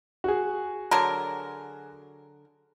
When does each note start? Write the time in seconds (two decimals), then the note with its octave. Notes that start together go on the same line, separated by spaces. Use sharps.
0.24 F#4 G#4
0.91 D3 F#3 A#4